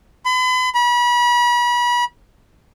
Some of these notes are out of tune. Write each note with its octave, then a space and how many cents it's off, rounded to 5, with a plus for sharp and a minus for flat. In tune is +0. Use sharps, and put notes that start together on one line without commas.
B5 +40
B5 -35